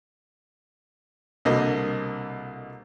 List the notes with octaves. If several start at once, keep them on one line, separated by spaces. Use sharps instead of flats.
C2 B2 D3 A#3 D#5